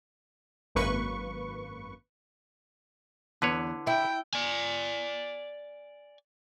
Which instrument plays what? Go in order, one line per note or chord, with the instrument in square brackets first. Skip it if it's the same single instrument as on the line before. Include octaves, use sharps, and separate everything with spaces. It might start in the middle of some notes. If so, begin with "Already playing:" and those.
[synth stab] G#1 F#2 A#3 B4 C#6
[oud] E2 [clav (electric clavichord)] D3 B4 C#5
[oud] E4 [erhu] G5
[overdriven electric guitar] D5 G#5